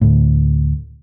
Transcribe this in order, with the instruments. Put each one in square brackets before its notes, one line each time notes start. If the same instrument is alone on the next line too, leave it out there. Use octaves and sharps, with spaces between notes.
[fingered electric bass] D2 A2